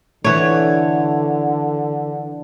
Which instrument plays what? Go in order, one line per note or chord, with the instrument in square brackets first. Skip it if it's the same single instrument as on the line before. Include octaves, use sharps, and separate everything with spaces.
[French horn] D3 [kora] E3 C#5